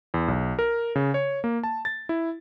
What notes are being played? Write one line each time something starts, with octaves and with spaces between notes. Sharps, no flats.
E2
B1
A#4
C#3
C#5
A#3
A5
A6
E4